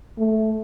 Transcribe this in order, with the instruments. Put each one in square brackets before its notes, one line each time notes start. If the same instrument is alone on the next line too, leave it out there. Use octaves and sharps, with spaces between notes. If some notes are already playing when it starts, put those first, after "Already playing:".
[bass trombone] A3